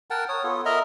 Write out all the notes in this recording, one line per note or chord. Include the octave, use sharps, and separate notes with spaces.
A#4 F#5 G5 A5
C#5 D#6
B3 F4 A4
A#4 D#5 E5 A#5